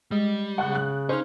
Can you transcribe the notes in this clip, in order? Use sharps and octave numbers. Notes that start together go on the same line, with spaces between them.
G3 G#3 D#5
C#3 F#5 C#6 F#6
F#6
C#4 D#4 C5 F5 F6